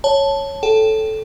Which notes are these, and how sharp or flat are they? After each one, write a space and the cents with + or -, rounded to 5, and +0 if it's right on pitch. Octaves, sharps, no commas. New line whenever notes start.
C#5 +0 A5 +0
A4 -10 G5 +0